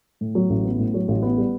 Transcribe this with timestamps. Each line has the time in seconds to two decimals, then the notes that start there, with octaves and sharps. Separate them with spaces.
0.21 A2
0.35 F#3
0.50 A1
0.65 B3
0.79 A2
0.94 F#3
1.08 A1
1.22 B3
1.38 G3